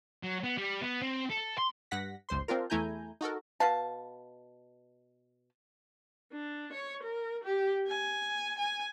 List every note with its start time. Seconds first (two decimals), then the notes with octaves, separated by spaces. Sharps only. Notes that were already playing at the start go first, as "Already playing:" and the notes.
0.23 F#3
0.43 B3
0.57 G3
0.81 B3
1.02 C4
1.29 A4
1.58 C6
1.91 G2 F#5 A#6 B6
2.29 G1 C#2 C5 C6
2.48 C4 D4 F4 A#4
2.70 E2 A3 E4 G#5 A#5 G6
3.21 D#4 F#4 A4 A#4
3.60 B2 B4 F5 A5
6.32 D4
6.73 C#5
7.03 A#4
7.44 G4
7.87 G#5
8.58 G#5